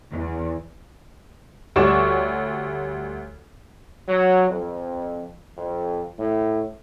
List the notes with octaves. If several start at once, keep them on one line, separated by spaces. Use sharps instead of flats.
E2
D2 G3 C#5 D5 C#6 E7
F#3
F2
F2
A2